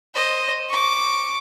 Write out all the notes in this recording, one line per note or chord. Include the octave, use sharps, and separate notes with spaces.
C5 D#5
C#6 D6